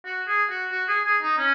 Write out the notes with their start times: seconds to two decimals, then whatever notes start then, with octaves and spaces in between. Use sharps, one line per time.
0.05 F#4
0.28 G#4
0.50 F#4
0.72 F#4
0.88 G#4
1.05 G#4
1.22 D#4
1.38 C#4